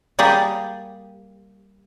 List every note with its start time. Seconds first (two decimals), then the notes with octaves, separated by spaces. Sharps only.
0.19 G3 A#3 G4 G#4 D5